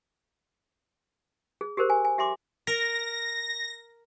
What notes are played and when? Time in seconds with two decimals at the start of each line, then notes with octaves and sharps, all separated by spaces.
1.61 G#4
1.77 G4 G#4 A#4 C5
1.90 G#5
2.05 G#5
2.18 G4 E5 G#5 C6 D6
2.67 A#4 A#6